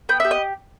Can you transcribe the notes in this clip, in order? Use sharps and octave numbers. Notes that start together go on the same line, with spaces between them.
B3 G5
G4 E5
D#5